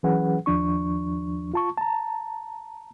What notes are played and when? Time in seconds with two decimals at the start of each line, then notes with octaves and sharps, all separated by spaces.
0.03 E3 F#3 C#4 G#4 B4 F#5
0.46 D#2 F3 D4 C#6
1.54 F4 A5 C#6
1.78 A5 A#5